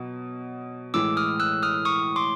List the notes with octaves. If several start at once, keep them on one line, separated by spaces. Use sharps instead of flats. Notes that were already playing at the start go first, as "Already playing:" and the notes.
Already playing: B2 F#3
A2 E3 G#3 D6 E6
D#6 F6
E6 F#6
D#6 F6
C#6 D#6
C6 D6